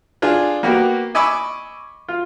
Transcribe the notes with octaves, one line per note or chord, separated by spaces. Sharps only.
D4 F4 G#4
A#3 B3 F#4 G4 A#4
D#5 G#5 B5 C#6 D6 E6
F4